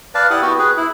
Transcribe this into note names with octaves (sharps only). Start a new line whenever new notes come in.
B4 D5 F5 A5
E4 G4 F#5 D#6
B3 F#4 G4
G#4 B4
E4